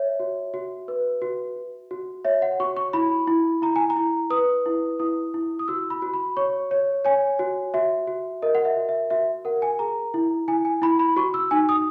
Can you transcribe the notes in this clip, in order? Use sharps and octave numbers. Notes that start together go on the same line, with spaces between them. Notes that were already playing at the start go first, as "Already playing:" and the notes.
Already playing: C#5 E5
F#4
F#4
B4
F#4
F#4
F#4
C#5 E5
F#5
F#4 C#6
C#6
E4 B5
E4
E4 A#5
G#5
A#5
E4
B4 D#6
E4
E4 D#6
E4
D#6
F#4 E6
B5
F#4
B5
C#5 C#6
C#5
C#5 G#5
F#4
F#4 E5
F#4
A#4 D#5
F#5
E5
F#4
E5
F#4 E5
A#4 F#5
G#5
G#4 A#5
E4
E4 G#5
G#5
E4 B5
B5
F#4 C#6
E6
D#4 G#5
D#6